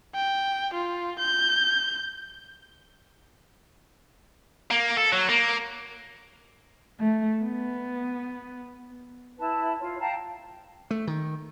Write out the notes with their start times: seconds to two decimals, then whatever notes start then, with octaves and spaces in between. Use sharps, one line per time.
0.15 G5
0.73 F4
1.19 G6
4.70 A#3
4.97 A4
5.13 F#3
5.29 A#3
6.98 A3
7.43 B3
9.38 E4 B4 A5
9.80 F4 C#5
9.99 F5 G5 A5 A#5
10.91 A3
11.07 D#3